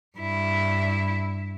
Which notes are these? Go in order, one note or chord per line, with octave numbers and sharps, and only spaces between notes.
G2 E4